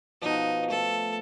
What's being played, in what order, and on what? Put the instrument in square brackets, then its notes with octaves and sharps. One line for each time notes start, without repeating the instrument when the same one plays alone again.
[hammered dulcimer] B2 F3 [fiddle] D#4
[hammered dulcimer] A3 [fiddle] A4